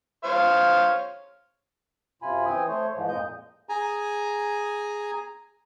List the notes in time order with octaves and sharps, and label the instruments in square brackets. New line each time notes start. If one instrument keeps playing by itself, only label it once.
[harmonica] C5 C#5 F5
[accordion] F#2 C3 F4 G#5 B5
E3 C4 G5 G#5 D#6
A3 C5 C#5
G#2 E3 F3
F2 A#2 G#3 D#5 G6
[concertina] G#4 G#5 A#5